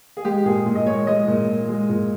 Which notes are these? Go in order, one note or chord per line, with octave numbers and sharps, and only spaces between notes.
G#4
G#3 G4
A#2 G#4
A#2
D#5
G#3 C#5
G#3 D#5
A#2
A#2
G#3
A#2